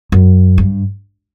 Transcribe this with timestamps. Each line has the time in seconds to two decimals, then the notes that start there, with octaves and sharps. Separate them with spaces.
0.12 F#2
0.58 G2